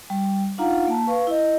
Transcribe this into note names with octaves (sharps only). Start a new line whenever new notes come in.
G3
D4 D#4 F4 F5 F#5 A#5
A#3 A5
B4 F5 C#6
E4 D#5